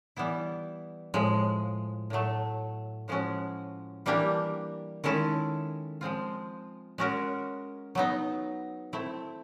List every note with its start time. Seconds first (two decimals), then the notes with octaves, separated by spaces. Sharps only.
0.16 E3 G3 B3 E4
1.14 A2 F3 G#3
2.10 A2 F#3 A3
3.08 A2 F3 G#3 C#4 F#4
4.06 E3 G3 A#3 D4 G4
5.04 D#3 G#3 C#4 E4 A4
6.01 F3 G#3 C4 F4
6.98 G#3 C#4 F#4 A#4
7.95 F#3 B3 D#4
8.93 A3 C4 E4